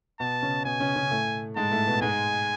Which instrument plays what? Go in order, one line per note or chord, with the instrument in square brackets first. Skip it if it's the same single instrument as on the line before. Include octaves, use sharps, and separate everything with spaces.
[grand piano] B2 B3 [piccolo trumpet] A5
[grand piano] C#3 C#4
[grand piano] B2 B3 [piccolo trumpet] G#5
[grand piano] C#3 C#4
C#3 C#4
A2 A3
[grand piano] G#2 G#3 [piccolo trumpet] A5
[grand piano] A2 A3
B2 B3
[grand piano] G#2 G#3 [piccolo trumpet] G#5